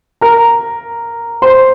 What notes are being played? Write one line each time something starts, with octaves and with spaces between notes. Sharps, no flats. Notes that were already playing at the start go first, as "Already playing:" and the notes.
A#4 A#5
C5 C6